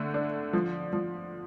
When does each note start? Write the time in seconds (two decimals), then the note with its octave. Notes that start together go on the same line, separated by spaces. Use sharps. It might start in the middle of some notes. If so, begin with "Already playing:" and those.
Already playing: D3 A3
0.14 D4
0.53 F3
0.93 F3